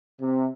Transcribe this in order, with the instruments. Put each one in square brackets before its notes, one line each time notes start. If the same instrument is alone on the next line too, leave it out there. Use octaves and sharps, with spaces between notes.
[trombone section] C3